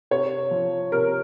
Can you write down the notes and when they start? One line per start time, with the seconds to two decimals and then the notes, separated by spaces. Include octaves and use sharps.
0.11 C3 C#5
0.51 F3
0.92 C3 A#4